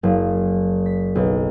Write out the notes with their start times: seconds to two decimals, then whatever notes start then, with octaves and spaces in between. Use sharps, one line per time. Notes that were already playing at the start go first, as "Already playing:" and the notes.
0.03 F#1
0.86 B6
1.15 B1